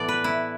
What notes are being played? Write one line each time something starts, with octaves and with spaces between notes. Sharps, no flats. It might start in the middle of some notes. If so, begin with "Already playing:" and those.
Already playing: A2 E3 B3 A4 D5
B4
E4